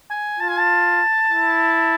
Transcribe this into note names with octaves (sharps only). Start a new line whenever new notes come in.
G#5
F4 A5
G#5
A5
E4